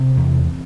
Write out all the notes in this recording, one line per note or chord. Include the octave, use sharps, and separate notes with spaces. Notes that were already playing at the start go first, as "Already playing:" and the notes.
Already playing: C3 C4
E2